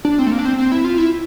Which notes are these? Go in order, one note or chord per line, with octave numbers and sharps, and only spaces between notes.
D4
C4
A3
A#3
D4
C4
C4
E4
F4
E4